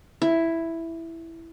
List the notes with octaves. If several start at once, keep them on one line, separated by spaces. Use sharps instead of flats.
E4